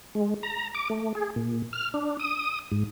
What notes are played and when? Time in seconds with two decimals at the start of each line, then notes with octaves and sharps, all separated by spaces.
0.15 G#3
0.43 A#5
0.75 D6
0.90 A3
1.15 G#4
1.36 A#2
1.73 F6
1.94 D4
2.20 D#6
2.72 G#2